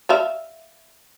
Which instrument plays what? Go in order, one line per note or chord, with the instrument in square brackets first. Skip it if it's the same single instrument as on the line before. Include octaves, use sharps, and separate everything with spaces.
[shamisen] D5 E5 F5